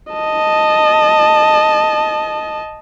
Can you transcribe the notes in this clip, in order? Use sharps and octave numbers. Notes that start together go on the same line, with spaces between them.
D#5 A5